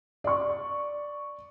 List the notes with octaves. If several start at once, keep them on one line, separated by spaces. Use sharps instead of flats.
D5 C#6